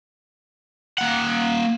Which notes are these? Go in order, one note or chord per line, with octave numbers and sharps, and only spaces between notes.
A#3 F#5